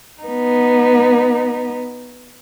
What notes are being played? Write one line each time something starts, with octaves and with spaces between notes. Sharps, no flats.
B3 D#4